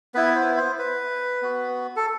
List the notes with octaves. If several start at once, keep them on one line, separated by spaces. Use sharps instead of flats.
B3 E4 B4
C5
C5
B4
B3 F#4
A4